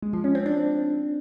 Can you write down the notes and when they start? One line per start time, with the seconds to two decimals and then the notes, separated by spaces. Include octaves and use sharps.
0.02 G#3
0.13 F3
0.24 C#4
0.35 C4
0.46 D4